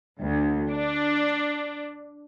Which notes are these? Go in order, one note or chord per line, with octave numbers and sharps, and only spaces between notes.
D2
D4